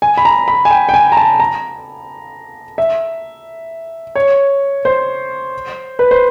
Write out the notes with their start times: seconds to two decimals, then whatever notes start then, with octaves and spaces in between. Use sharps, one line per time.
0.02 G#5
0.17 B5
0.25 A#5
0.48 B5
0.65 G#5
0.71 G5
0.89 G5
0.94 G#5
1.12 A#5
1.17 A5
1.40 A#5
2.78 E5
4.16 C#5
4.85 C5
5.99 B4
6.11 C5